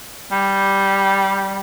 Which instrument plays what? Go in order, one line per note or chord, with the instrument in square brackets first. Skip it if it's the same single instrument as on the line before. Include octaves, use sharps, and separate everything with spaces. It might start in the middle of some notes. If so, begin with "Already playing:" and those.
[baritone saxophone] G3